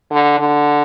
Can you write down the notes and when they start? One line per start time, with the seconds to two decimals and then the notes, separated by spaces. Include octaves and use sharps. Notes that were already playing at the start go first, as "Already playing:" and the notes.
0.11 D3
0.39 D3